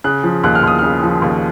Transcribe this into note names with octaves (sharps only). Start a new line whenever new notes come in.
C#3 F#6
F3
D#2 F#6
F6
D#2 D#6
C#3 F6
F3
D#2